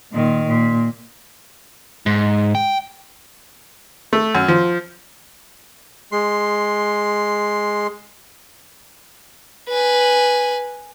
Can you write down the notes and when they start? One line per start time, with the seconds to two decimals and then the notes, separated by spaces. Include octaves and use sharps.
0.13 A#2 D#3
0.46 A#2
2.06 G#2
2.55 G5
4.13 A3
4.35 F#2
4.48 F3
6.12 G#3 C6
9.68 B4 G#5